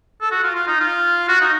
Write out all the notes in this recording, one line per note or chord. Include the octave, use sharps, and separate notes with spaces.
A4
F#4
F4
F4
D#4
F4
F#4
D#4